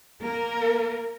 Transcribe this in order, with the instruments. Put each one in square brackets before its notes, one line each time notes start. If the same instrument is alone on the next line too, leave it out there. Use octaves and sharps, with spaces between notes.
[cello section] A#3 A#4